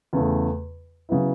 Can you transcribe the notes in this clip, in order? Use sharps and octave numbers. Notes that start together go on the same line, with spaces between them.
E2 C#3 A3
C#3 F#3 B3 E4